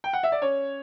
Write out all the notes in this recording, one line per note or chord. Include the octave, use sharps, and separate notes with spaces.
G5
F#5
E5
D5
C#4 C#5